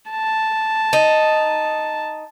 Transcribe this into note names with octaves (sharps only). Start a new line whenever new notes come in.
A5
D#4